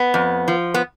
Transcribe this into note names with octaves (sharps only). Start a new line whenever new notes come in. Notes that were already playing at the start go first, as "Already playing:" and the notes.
Already playing: B3
F2
F3
B3